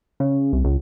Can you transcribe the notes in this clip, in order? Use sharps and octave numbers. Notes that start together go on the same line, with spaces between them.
C#3
C2
C#2